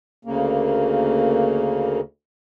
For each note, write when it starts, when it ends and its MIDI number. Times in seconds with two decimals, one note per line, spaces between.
0.25 2.00 38
0.25 2.00 49
0.25 2.00 58